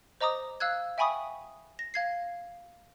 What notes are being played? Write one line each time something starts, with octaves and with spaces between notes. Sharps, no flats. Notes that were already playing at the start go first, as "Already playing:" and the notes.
C5 D#5 A#5 D6 D#6
F5 E6 F#6 G#6
E5 G5 G#5 B5 C#6 D#6
A#6
F5 G#6 C7